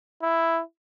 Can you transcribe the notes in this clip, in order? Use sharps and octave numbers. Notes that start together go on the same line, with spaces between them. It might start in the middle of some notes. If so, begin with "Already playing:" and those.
E4